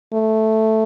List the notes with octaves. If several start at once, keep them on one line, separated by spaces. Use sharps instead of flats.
A3